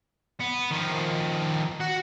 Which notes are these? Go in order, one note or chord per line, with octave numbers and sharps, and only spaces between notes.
B3
D#3 F3
F#4 F#5